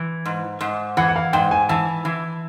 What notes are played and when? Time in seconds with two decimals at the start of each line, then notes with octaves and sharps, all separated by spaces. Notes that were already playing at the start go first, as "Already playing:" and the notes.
Already playing: E3
0.26 G#2
0.61 G#2
0.97 E3 F#5
1.09 F#5
1.16 F5
1.33 G#2 G5
1.51 G#5
1.69 E3 A5
2.05 E3